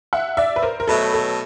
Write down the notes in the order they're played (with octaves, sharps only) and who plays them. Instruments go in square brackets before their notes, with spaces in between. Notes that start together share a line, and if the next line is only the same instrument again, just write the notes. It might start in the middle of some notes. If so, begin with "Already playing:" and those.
[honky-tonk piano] E5 F#5
D5 E5
B4
A#4 C5
A#4
[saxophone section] B2 F#3 A3 [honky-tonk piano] A4 B4
[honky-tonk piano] A4